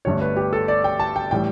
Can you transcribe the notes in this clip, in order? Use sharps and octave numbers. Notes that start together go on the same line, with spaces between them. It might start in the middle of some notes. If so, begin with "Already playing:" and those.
G1 G2 D3 A3 C#5
B4
G4
A4
D5
G5
A5
G5
A2 E3 G3 G5